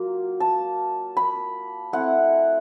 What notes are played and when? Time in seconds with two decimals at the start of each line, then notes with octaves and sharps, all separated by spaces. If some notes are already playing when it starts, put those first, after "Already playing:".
Already playing: F#3 A#3 F4
0.40 A5
1.17 B5
1.93 A3 C4 E4 F#5